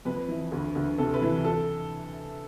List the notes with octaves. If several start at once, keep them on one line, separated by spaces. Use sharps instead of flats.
F2 B4
E3
D2
D2
C3 A4
B4
E3
A4